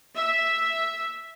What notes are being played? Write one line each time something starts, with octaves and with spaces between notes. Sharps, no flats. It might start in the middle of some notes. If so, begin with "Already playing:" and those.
E5